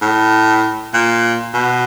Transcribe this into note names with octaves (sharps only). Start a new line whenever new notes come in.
A2
A#2
B2